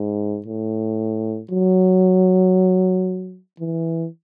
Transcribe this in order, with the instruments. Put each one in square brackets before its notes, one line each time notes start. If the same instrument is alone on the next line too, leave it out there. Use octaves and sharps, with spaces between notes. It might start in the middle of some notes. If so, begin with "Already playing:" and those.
Already playing: [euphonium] G#2
A2
F#3
E3